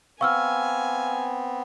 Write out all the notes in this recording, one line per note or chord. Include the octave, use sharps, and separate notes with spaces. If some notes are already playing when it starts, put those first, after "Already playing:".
B3 C4 F5 G#5 C#6 E6 F6